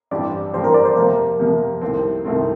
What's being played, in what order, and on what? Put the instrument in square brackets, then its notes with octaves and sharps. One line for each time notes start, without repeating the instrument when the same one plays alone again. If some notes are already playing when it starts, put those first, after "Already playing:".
[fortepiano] A1 G2 F3 C4 G4 [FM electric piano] D5
[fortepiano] A1 G2 F3 C4 G4 [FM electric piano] C5
[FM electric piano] A#4
D5
C5
[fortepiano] F2 C3 F3 A#3 [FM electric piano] A#4
[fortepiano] F2 C3 F3 A#3
C2 C3 D#3 A3 C4
C2 C3 D#3 A3 C4